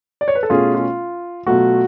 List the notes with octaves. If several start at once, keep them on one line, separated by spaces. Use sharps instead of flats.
D5
C#5
B4
A4
B2 A3 C#4 F4 G#4
F4
B2 F#3 A3 F4 F#4